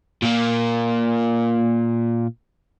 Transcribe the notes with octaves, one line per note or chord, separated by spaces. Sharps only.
A#2 A#3